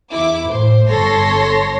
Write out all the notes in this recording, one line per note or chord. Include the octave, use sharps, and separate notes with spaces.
E2 E4 D6
A2 C5
G1 A4 C#5 A5 C6 A#6